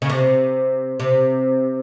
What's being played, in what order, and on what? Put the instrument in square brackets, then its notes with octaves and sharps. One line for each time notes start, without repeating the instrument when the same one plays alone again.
[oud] C#3
C3
C3